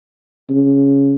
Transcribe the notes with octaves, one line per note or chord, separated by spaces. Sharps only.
C#3